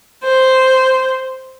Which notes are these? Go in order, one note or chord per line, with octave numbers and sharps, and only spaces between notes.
C5